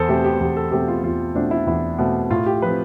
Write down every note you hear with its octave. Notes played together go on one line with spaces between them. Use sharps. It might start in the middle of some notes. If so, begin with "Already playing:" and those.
Already playing: E2 A4 C5
B2 A3 C4 G4
G4
E2 G4
A4
B2 A3 C4 G4
F4
E2 F4
B2 A3 C4 D4
E4
E2 E4
B2 A3 C4
A2 F4
G4
F3 C4 B4